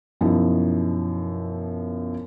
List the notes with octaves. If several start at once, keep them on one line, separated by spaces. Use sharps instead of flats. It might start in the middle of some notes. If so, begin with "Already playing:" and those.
F#2 B2 F3 D#4 E4